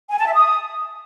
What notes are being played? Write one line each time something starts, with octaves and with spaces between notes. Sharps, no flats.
G#5
A5
E5
D#6